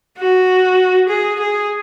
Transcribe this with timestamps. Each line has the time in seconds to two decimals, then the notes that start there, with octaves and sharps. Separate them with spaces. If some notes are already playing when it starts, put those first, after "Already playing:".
0.18 F#4
1.09 G#4
1.40 G#4